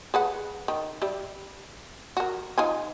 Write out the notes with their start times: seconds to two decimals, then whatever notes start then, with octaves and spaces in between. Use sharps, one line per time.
0.14 G#4 B4 F#5
0.68 D#3
1.02 G3 G4 E5
2.17 F#4 A#4
2.58 D#4 F4 G#5